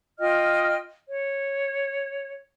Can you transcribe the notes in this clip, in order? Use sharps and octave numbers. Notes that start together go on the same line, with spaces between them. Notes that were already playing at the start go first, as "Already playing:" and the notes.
F4 D#5 G5 F6
C#5